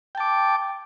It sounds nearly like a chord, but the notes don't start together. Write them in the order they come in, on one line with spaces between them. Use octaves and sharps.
G5 A5 D6